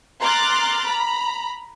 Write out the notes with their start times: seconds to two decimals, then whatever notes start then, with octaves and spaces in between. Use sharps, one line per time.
0.20 A#5 C6 D6 F6 F#6 A6
0.87 A#5 B5